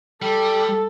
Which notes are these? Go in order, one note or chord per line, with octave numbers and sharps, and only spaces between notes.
G3 A4 G5